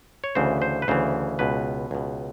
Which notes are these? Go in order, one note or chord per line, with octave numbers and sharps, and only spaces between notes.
C#5
D2 C#3 E3 C5
C5
B4
D2 C#3 E3 C5
C#2 B2 B4
C#2 B2